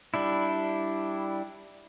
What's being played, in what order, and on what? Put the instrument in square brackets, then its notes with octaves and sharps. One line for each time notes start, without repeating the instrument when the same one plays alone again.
[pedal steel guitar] G3 D4 E4